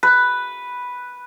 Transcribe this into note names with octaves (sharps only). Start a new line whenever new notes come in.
B4